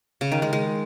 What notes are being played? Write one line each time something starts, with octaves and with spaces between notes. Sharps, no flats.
C#3
D#3
G#3
G#3